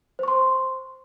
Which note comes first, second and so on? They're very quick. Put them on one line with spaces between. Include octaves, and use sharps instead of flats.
C5 C#6 C6